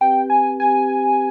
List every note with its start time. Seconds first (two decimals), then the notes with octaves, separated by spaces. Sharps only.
0.01 C4 G4 B4 G5
0.30 G#5
0.59 C4 G4 B4 G#5